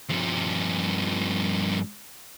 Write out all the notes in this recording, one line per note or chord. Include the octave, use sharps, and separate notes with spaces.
G2 F3